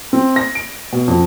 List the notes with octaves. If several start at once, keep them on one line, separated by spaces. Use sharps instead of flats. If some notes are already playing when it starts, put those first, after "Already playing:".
C4
A#6
D7
B2
F2